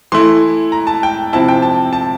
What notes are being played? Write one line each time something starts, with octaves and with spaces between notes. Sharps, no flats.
E3 A3 E4 C6
A#5
A5
G5
C3 F3 C4 E4 A5
G5
A5
A5